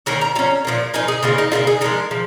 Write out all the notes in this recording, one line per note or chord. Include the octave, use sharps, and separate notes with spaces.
D#3 A#3 C#4 A#4
A#5
F3 C#4 A#5
A#2 F3 A#3
F3 A#3 D#4 G#5
G#4
C#3 A#3 D#4 F4
D#4
C#3 A#3 D#4 F4
G#4
F3 G#3 D#4 A#4
F3